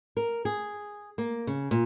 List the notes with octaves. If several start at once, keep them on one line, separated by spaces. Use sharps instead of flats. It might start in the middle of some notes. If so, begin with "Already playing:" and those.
A#4
G#4
A#3
C#3
A#2